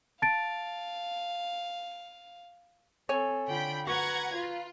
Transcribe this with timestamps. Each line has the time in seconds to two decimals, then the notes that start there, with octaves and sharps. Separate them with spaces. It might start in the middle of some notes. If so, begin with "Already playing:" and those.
0.22 F5 A5 A6 D7
3.09 C4 A4 C#5 G#5
3.48 D3 F4 G5 B5
3.87 F#4 B4 F#5 A#5 G#6
4.34 F4